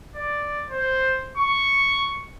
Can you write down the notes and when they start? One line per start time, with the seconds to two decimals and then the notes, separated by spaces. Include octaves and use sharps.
0.15 D5
0.70 C5
1.38 C#6